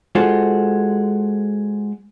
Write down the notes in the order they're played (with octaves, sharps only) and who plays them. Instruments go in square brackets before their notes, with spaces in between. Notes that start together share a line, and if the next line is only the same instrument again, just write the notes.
[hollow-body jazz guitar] G#3 F4 F#4 A4 C5